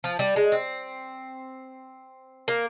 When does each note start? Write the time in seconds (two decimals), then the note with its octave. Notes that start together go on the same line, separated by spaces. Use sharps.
0.04 F3
0.19 G3
0.36 G#3
0.52 C4
2.48 A#3